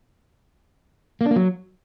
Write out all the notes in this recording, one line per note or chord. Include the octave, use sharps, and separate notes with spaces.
A#3
D4
A#3
F#3